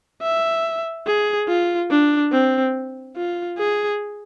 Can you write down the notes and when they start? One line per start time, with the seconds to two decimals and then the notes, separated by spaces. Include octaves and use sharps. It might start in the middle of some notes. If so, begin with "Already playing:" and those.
0.22 E5
1.07 G#4
1.48 F4
1.90 D4
2.32 C4
3.16 F4
3.58 G#4